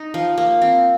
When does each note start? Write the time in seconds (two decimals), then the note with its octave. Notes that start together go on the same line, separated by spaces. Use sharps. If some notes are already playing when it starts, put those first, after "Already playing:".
Already playing: D#4
0.14 F3
0.38 A#3
0.62 C4